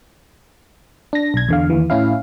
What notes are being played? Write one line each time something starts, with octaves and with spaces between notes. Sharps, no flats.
D4 A#6
B1 G#6
E2 D3 F5
D#2 E3
A2 C#4 E4 F5